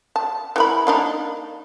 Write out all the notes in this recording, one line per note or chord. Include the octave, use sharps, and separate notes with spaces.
A5
E3 A#4 B5
A#3 D4 D#4